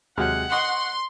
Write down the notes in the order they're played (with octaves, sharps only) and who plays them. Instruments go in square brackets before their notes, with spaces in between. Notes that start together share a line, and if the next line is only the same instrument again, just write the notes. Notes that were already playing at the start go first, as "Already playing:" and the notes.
[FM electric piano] D#2 F#3 G5 [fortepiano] C3 G#3 F6 [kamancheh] F#5
[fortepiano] D#5 [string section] C6 [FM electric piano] C#6